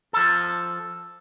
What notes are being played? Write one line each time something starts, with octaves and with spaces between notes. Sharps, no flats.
F3 A4